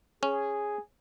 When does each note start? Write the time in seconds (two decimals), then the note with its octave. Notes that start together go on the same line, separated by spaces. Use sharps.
0.23 C#4 G#4